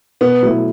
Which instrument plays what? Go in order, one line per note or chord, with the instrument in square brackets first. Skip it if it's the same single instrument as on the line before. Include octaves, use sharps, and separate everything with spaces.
[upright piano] B2 [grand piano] B3
[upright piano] F#3 A3 E4